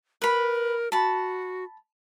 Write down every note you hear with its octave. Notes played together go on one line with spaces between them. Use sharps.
A#4 B4 B5
F#4 A5 B5